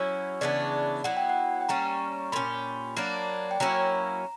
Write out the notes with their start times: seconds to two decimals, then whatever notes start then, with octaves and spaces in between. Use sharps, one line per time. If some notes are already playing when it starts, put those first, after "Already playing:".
Already playing: F#3 C#4 E4 C#5
0.41 C#3 E3 B3 D4 D5
1.04 F#3 B3 E4 F#5
1.17 G5
1.29 F#5
1.61 G5
1.69 G3 A#3 C#4 A#5
2.32 A#2 A#3 C#4 G4 B5
2.97 F#3 A#3 D4
3.51 G5
3.60 F#3 A#3 C#4 E4 A#5